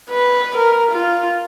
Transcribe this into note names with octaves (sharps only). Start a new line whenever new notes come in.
B4
A#4
F4